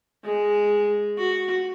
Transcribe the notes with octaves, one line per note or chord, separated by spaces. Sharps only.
G#3
F#4